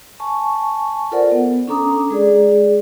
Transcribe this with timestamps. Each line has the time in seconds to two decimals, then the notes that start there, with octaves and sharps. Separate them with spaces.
0.20 G#5 A5 C#6
1.12 F4 A4 A#4 C5 D5 F#5
1.32 B3
1.67 C#4 D4 A4 A#5 D6 D#6
2.10 G#3 G#4 D5